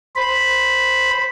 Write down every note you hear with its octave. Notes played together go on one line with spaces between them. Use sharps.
C5 B5